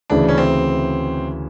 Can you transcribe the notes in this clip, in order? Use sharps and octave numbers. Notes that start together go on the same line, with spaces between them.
D2 C#3 E3 D4
C#4
C4